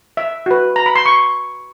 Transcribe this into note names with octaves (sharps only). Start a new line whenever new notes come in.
E5
F#4 B4
A#5
B5
C6
C#6